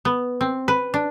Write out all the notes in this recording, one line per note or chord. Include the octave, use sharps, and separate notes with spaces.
B3
C4
B4
D4